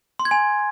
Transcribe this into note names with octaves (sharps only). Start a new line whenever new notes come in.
C6
G#6
G#5